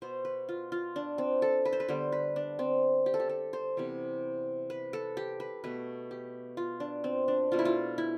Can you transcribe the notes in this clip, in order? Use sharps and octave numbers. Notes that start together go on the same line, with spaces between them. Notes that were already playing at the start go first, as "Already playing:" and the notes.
B2 B3 C5
B4
F4
F4
D4
C4
A4
B4
C5
B4
D3 G3 B3 C5
B4
D4
C4
G4
A4
G4
A4
C5
C3 E3 G3 B3
B4
A4
G4
B4
B2 A3 B4
G4
F4
D4
C4
D4
B2 A3 F4
E4
F4
E4